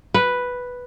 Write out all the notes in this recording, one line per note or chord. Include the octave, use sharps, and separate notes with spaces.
B4